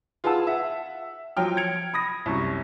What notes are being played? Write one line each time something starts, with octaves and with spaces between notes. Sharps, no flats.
F4 G#4 B4 F#5 A5 E6
E5 F#5
F3 F#3 G5 F6
G#6 C#7 D7 F7
B5 D#6 A#6
C2 F#2 C#6